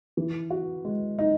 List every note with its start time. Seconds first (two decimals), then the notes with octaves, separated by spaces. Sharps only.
0.17 E3
0.50 F#4
0.85 G#3
1.19 D#4